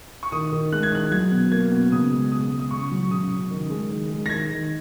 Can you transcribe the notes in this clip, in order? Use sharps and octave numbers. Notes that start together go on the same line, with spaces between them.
C#6
D#3 D#6
D#3
G#3 F#6
G#6
D#3 F#6
F#3 G#6
B2
A#3 G#6
B2
C#3 D#6
G#3
G#3 D#6
G#3
D#6
C#3 C#6
F#3
C#3 D#6
C#3
D#3
G#3
D#3
G#3
A#6
D#3 G#6
D#3